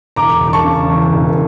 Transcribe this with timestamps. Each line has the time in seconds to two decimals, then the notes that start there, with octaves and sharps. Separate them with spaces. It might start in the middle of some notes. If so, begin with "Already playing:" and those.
0.16 E1 A#5 D6
0.40 E1
0.47 D6
0.53 A5 C#6
0.64 C#3
0.88 E2
1.13 E1